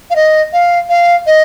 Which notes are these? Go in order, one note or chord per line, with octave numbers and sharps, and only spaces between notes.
F5
D#5
F5
F5
D#5